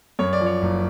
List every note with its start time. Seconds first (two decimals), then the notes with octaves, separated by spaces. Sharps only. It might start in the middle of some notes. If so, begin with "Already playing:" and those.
0.19 F#2 C#5
0.33 D5
0.40 F3
0.46 C#5
0.62 F#1